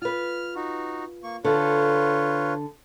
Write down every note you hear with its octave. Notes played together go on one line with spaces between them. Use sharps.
F4 B4 F6
D#4 F#4
A#3 C#6
D3 F4 A4 B4 C#5